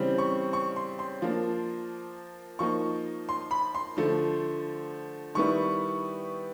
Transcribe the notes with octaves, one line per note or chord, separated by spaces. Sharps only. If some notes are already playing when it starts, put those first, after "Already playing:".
Already playing: C#3 E3 G3 C4
C#6
C#6
C6
C6
F3 A#3 D4
F3 A#3 D#4 C#6
C6
B5
C6
D3 F3 A3
D#3 G3 B3 E4 C#6